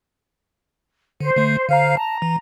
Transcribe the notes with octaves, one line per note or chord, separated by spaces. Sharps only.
D3 C5
D3 A3
D3 C5 F5 A#5
A5 A#5
E3